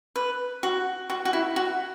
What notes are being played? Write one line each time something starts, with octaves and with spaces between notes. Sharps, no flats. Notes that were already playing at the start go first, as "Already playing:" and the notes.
B4
F#4
F#4
F#4
E4
F#4